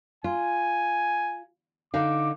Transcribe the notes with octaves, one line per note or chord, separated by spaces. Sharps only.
F4 G#5
D3 D#4 F5 D6